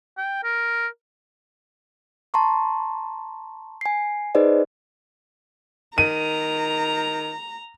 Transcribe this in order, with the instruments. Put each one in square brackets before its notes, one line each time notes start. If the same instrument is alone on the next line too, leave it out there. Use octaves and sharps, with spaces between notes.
[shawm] G5
A#4
[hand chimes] A5 A#5 C6 C#6
G#5 C7
D#4 G#4 B4 C5 D5 D#5
[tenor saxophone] D#3 [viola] A#5 [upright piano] D#7